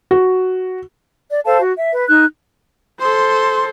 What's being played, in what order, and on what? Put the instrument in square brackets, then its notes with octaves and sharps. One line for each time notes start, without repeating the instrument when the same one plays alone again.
[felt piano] F#4
[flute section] D5
A4 C5 F5 A5
F#4
E5
B4
D#4 F#6
[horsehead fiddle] A4 C5 [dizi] C6